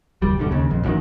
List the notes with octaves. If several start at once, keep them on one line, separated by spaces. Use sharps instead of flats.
F#1 D#2 G3
E1 G2 D3
D#2 C#3
A#1 F2
A1 F#2 D3 D#3